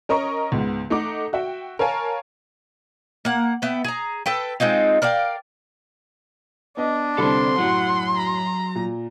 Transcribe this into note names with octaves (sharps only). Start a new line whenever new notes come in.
C#4 A#4 D#5 A#5 C#6
C#2 G#2 B3
A3 D#4 F#5 D6
F#4 E5 G5
A#4 C#5 F5 G#5 A5
A#3 F#5
B3 E5 G5
G#4 A#5
A4 B4 G5
G#3 C4 D#4 F4
A#4 D5 F5 G5
B3 D4 D#5
C2 D3 C4 A4 B5 C6
F#2 A2 F#3 F#5
A#5
A#2